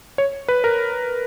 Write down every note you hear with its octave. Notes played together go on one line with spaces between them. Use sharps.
C#5
B4
A#4